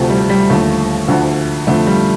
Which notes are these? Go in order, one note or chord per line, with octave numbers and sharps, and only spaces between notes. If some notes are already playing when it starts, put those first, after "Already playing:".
Already playing: D2 C3 F3 A3
G3
G3
D#2 D3 F3 A3
D2 D3 F3
F2 D3 F3 A3
G3